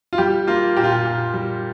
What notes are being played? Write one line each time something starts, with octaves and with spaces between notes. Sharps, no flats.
F4
G3 G4
A#3 F4
A#2 G4
F4
G4
A#2
G3